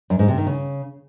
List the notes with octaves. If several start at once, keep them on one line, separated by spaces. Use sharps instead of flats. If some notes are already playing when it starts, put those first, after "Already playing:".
F#2
G#2
C3
D#3
C#3